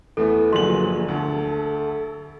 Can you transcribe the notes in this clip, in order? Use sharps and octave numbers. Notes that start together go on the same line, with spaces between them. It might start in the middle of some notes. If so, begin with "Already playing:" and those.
E2 A3 B3 A4
G1 F3 F#3 A#3 G#4 C6 F#7
D2 A4